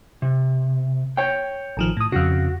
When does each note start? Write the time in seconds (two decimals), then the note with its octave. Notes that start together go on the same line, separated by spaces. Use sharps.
0.22 C3
1.17 C#5 G5
1.77 A1 D#3 F3
1.97 A2 D#6
2.12 F2 C#3 F#4